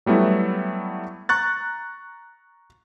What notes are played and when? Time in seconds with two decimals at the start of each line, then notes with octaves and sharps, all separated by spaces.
0.06 F#3 G3 A3 B3 E4
1.29 A#5 C#6 F#6 A6